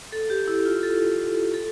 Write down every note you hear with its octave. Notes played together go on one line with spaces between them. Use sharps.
A4
G4
E4
F4
A4
A4